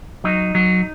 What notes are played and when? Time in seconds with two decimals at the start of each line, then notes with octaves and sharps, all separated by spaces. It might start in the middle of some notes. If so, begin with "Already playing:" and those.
0.24 F#3 D#4
0.55 F#3